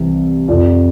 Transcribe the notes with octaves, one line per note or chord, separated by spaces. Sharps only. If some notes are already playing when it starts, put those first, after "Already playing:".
Already playing: C2 C3 E3
F2 C3 F3 D5